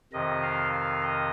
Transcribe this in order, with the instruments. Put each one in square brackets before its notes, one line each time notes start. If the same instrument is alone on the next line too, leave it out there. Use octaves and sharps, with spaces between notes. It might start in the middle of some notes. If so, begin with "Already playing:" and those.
[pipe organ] F2 C3 D#3 D#5
F5
F5
D#5